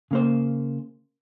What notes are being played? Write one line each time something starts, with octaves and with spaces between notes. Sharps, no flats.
C#3 A#3 C5